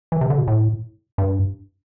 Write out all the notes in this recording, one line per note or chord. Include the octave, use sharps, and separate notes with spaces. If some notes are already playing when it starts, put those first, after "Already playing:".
E3
C3
D3
B2
A2
G2